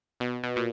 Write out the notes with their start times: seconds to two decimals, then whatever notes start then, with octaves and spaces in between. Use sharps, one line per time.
0.20 B2
0.43 B2
0.56 A#2